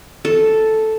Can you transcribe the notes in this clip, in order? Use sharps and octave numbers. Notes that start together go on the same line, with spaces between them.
A4